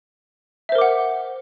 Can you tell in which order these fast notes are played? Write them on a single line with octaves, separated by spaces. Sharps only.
E5 C5 A#4 D6 F#5